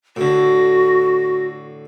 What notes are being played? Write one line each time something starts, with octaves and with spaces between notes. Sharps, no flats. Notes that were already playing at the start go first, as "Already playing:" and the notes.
A2 D3 F#4